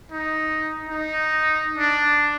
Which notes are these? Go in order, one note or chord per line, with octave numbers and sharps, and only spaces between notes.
D#4
D#4
D4